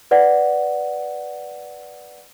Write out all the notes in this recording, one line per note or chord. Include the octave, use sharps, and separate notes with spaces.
B4 D5 F#5